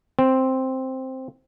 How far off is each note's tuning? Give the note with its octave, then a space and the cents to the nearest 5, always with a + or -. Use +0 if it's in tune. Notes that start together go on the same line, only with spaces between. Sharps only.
C4 +0